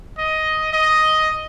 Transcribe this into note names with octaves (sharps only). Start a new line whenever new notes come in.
D#5
D#5